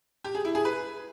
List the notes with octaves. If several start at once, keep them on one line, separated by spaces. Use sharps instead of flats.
G4
G#4
E4
G#4
B4